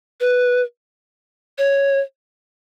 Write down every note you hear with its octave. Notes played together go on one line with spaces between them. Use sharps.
B4
C#5